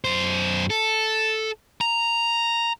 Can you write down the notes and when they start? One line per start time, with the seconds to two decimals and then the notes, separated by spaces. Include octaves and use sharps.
0.05 F#2 C5
0.70 A4
1.81 A#5